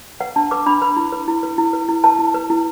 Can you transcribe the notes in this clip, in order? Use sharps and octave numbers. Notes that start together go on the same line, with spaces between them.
B4 F#5
D4 A5
B4 D6
D4 B5
B4 B5
E4
B4
E4
B4
E4
B4
E4
B4 A5
E4
B4
E4